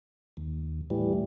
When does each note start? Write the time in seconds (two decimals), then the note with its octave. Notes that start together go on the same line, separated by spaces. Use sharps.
0.37 D#2
0.90 A2 E3 G3